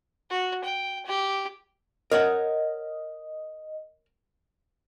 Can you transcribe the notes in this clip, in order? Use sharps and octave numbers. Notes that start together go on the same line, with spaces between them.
F#4
G5
G4
A#4 C#5 D#5 F#5